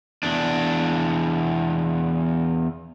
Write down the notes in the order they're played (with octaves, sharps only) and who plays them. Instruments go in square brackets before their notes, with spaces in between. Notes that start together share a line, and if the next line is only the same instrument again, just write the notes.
[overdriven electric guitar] E2 D4